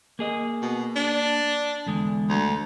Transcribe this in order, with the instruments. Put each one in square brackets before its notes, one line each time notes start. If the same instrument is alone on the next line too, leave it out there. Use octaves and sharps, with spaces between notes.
[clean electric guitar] A#3 G#4 D#5
[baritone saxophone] B2
D4
[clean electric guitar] E2 D3 G#3
[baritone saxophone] D2